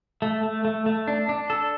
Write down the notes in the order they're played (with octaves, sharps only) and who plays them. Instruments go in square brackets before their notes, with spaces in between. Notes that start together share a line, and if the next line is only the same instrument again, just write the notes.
[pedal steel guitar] A3
A3
A3
A3
D4
D4
A4